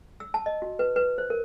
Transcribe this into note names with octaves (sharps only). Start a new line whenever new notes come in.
E6
A5
D#5
F#4
B4
B4
C5
A#4